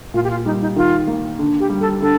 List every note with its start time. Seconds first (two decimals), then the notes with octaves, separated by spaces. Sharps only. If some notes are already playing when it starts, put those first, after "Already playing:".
0.14 A#2 F4
0.24 G4
0.30 F4
0.45 G3 D#4
0.61 D#4
0.76 D#3 F4
1.07 A#3
1.39 D3
1.60 G4
1.70 G3
1.81 A4
2.02 D3 A4